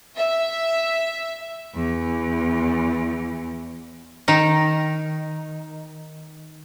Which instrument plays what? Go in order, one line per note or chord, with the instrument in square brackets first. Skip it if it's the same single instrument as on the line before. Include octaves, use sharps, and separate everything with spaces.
[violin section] E5
[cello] E2 E3
[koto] D#3 D#4